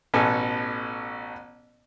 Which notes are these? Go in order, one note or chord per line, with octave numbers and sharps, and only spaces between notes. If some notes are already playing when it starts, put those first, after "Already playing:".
A1 B2 B3 A4 G#5